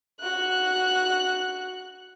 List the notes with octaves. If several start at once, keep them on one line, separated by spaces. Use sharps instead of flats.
F#4 F#6